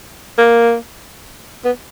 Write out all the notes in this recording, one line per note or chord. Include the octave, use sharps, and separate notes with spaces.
A#3
B3